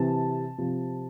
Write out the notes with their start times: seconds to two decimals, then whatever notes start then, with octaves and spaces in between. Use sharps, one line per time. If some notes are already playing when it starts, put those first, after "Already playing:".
Already playing: C3 E3 A5
0.58 C3 F3